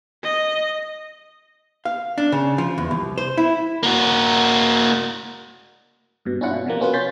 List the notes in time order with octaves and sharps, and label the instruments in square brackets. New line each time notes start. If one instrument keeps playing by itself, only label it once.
[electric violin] D#5
[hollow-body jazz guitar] F5
D4
C#3
F3
E2
C2
C5
E4
[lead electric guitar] A#3 F#4
[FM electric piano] G2 B2
C#4 D4 E4 F4 F#5
B2
C3 F3 A#3
B3 C#4 F4 F#4 B4
C#4 C6 G6 A6 B6